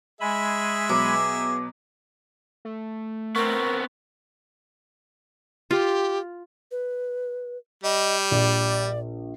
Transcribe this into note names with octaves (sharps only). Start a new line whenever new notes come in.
G#3 G#4 E5 G#5 B5
B2 F#3 D6
A3
B3 C4 A#4 C#6
F4 G4
B4
G3 D#5
A#1 D5